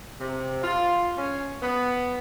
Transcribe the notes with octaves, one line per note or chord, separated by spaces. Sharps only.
C3
F4
C#4
B3